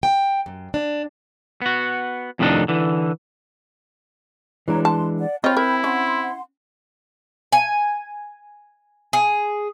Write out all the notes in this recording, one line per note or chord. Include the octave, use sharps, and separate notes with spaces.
G5
F#2
D4
B3 F#4
F2 A2 C3 D#3 D4 D#4
D3 E3
E3 G#3 D4 C#5 A#5
A5 C6
D5 F#5
C4 F4 C#5 D#5 G5 B5 G6
E4 A#4
C#4 F#5 C6
G#5
G#4